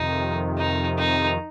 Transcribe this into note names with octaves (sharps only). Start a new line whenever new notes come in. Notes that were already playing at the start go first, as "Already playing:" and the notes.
Already playing: F2 C3 D#3 D#4
D#4
D#4